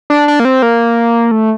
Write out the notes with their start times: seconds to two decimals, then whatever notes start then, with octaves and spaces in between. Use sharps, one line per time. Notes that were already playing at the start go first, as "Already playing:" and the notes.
0.10 D4
0.28 D4
0.40 A#3
0.45 C4
0.62 A#3
1.31 A3